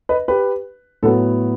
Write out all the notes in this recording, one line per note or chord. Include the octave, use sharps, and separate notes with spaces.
B4 D#5
G4 B4
A2 F#3 B3 A4